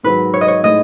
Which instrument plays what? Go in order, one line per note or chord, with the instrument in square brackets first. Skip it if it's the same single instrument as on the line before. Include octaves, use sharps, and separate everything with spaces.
[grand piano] G#2 D#3 F#3 [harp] B4
[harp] C#5
D#5
C#5
[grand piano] A2 G#3 D#4 [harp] D#5